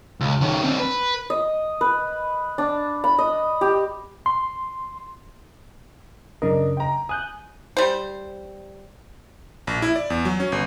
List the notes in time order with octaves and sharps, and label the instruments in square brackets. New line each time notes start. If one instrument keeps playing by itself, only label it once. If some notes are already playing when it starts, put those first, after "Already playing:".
[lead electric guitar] C#2
D#3 C#4
C4 D4
B4
[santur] D#5
B4
D4
B5
D#5
G4
[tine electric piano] C6
[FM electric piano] F#2 C#3 D#5 [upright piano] D4 A#4
[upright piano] G5 A#5
[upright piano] G#5 [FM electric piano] D#6 F#6 G6
[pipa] G3 C5
[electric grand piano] A#1
E4
D5
E2
F#3
C#4
G1